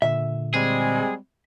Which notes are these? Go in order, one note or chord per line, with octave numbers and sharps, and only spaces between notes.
A#2 D3 E5
G3 G#3 C4 G#4